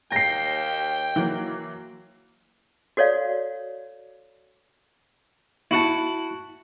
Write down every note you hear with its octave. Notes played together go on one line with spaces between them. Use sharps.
D#2 G5 A#6 C7
E3 F#3 A#3
F#4 A4 C#5 D5 F5
E4 F#4 F#5 A5